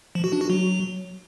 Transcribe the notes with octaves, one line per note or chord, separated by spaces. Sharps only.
F3
F#4
D4
F#4
F#3